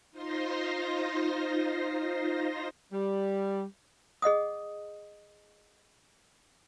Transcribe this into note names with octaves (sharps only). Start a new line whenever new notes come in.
D#4 F4 C5 C6 A#6
G3
G#4 D#5 F#5 D#6